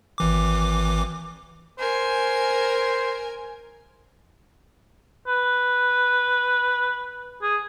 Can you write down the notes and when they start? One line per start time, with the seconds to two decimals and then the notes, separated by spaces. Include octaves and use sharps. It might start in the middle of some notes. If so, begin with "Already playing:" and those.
0.18 G#1 E3 D6
1.79 A#4 C5 G#5
5.27 B4
7.42 G#4